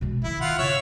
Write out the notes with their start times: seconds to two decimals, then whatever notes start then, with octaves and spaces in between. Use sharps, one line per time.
0.01 B2 G#3
0.24 D#3 E4
0.41 F4 F#5
0.59 C#3 C#5 E5